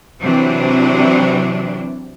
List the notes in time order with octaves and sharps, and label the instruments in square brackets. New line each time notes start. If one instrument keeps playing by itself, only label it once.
[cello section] C3 E3 F#3 C4 D4